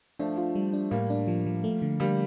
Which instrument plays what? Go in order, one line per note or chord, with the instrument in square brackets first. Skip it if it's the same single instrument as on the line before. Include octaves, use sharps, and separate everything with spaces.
[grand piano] F3 A3 [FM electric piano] D4
[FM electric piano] F4
G3
D4
[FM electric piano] A2 [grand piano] G3 A#3
[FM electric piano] D4
F3
F3
A3
D3
[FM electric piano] D3 [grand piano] G3 A#3